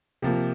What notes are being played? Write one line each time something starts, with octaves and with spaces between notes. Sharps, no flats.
C3 F3 A#3